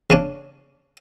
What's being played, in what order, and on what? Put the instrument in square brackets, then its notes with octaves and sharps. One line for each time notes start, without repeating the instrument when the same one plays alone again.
[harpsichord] C#3 C#4 D4